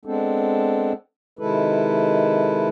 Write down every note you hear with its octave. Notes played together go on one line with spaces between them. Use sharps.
G#3 B3 C4 D4 A4
C3 D#3 G#3 E4 A4 B4